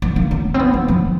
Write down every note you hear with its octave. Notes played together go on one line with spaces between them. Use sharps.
B3
A#3
B3
C4
B3
A#3
F3